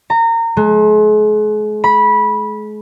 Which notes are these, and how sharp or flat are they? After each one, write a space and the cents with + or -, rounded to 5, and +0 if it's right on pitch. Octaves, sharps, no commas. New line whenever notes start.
A#5 -25
G#3 +40
B5 -15